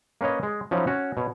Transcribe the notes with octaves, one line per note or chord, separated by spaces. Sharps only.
A#3 C#4 B4 C#5 D#5
G#3
F3 F#3 C#4 D#4 E4
C#4 F#4
B2 C#5